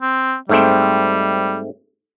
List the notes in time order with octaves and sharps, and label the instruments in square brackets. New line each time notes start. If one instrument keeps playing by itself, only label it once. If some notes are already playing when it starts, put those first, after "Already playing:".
[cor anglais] C4
[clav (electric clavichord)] G#2 A3 C4 [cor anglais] G3